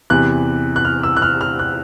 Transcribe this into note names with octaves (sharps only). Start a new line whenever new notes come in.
E2 C3 E3 F#6
F#6
F6
E6
F#6
F6
F6
F#6